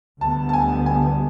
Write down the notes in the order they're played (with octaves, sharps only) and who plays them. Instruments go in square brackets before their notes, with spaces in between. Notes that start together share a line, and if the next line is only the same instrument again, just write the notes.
[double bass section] D2 D3 G3 B3 [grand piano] A5
[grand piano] A5
G#5
G#5